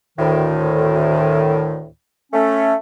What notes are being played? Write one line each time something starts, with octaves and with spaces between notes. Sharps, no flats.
D2 A2 D#3
A3 C#4